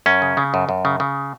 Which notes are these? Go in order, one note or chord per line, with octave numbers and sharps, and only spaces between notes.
F#2 C#4
C#3
C#3
F#2
F#2
C#3
C#3